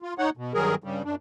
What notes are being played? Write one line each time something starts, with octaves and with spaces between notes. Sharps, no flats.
F4
D#4 C#5 F#5
B2
G2 D#3 F#3 G#4 A#4
G2 C#3 G3
F#2 D4